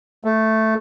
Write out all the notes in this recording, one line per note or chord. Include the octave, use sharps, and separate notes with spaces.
A3